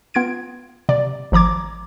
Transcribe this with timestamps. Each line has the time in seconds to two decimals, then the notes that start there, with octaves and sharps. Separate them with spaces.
0.14 B3 F4 G#6 D7
0.89 C3 D5
1.32 G#1 F3 A#5 D6 G#6